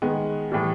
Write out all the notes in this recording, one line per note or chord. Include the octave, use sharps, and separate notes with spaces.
D#3 G#3 B3
A2 E3 G3